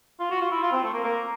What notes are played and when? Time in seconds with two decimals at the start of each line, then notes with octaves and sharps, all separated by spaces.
0.19 F4
0.31 F#4
0.41 F4
0.51 E4
0.62 F4
0.72 C4
0.83 A3
0.93 A#3
1.03 A#3